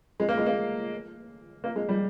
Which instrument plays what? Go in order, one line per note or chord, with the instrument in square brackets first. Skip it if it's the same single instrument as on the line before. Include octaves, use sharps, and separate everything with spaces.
[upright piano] G#3
A#3
G#3
A#3
A#3
G#3
G3